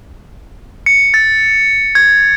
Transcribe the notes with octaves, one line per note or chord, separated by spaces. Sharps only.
C#7
A6
G#6